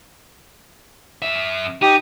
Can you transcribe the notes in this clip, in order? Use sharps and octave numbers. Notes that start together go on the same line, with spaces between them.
F#2 E5
D#4 G4